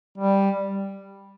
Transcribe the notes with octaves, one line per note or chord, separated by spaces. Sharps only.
G3